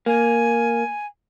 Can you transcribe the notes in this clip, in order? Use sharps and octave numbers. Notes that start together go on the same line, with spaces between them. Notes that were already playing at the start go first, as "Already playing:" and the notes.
A#3 G#5